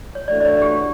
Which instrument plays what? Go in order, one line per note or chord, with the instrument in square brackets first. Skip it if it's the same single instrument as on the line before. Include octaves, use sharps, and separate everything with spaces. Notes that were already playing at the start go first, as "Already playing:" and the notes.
[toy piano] C#5
[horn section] E3 A3 D4 F#4 [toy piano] D5
[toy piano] D5
C#5
G4